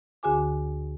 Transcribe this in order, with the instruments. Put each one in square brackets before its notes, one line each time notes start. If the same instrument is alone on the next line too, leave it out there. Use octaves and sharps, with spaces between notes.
[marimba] D2 D3 F#4 G#4 G#5 D6